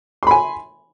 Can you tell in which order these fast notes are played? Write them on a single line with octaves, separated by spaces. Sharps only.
C6 B5 G#5